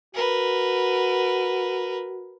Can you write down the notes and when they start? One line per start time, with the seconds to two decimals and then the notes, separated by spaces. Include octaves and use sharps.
0.14 F#4 A#4 B4